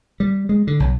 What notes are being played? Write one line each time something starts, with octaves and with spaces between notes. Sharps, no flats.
G3
G#3
D3
B1